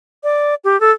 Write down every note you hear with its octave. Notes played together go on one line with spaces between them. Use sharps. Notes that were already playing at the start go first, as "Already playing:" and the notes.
D5
G4
A4